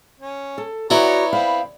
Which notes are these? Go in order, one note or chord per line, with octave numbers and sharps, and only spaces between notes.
C#4
A4
B3 E4 F#4 C#5 D5 A#5
C4 F5 B5